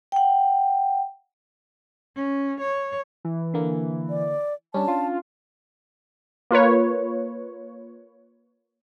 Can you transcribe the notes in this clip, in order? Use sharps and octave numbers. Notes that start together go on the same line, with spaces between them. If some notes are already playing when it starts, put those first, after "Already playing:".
F#5 G5
C#4
C#5
E3
D3 A#3
D5
G3 C#4 D4 A5
F4
A#3 F4 B4 C#5